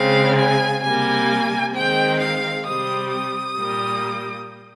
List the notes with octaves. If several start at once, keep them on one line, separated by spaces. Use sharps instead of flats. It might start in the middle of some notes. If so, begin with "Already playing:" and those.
Already playing: C#3 G#3 C4 F5
G#5
C3 G3 A#3 G#5
D#3 G#3 C4 G5
F5
C3 G3 C4 D#6
D#6
A#2 G3 A#3